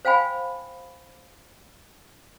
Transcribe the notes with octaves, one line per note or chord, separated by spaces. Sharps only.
C5 F5 G5 G#5 B5